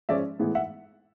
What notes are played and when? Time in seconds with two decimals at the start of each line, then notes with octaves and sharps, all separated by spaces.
0.09 F3 G#3 C#4 D5 E5
0.39 A2 E3 G#3 B3
0.55 E5 F#5